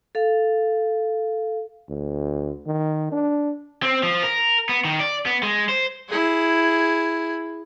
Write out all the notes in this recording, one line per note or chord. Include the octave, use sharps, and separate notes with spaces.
A4 F5
D2
D#3
D4
C4
F3
A#4
B3
D#3
D5
B3
G#3
C5
E4 G#4